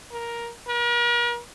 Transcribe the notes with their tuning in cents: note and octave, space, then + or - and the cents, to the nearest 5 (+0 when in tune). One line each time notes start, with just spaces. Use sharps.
A#4 +10
A#4 +45